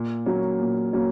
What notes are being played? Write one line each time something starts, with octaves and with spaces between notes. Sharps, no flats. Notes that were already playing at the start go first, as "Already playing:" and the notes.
Already playing: A#2
F#3 A#3 C#4
A#2
F#3 A#3 C#4